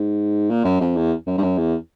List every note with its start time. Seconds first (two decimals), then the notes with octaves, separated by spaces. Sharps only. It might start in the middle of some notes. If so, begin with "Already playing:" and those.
Already playing: G#2
0.50 A#2
0.64 F#2
0.81 F2
0.96 E2
1.27 F#2
1.38 G2
1.43 F#2
1.58 E2